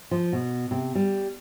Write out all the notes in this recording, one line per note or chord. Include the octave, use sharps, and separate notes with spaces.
F3
B2
C3
G3